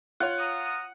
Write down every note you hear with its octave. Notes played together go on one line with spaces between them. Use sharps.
F4 C#5 F#5
F5 A#5 D#6